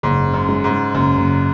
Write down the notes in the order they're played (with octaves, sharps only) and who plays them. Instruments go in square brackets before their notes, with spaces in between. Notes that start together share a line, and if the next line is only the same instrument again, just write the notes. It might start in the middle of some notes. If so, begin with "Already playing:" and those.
[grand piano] F#1 [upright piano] G#2
[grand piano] C#3
[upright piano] F#2
[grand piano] G#3
[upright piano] G#2
[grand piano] G#3
[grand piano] F#1 [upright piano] F#2
[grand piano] F#1